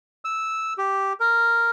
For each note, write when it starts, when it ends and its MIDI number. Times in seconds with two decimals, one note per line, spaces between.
0.25 0.74 88
0.78 1.13 67
1.20 1.71 70